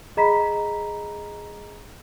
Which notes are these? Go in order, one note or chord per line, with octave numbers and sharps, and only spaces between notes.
G#4 D#5 A#5 B5 B6